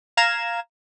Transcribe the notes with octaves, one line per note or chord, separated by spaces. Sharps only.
F5 A#5 G#6 E7